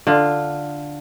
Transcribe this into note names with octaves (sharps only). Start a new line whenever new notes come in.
D3 F4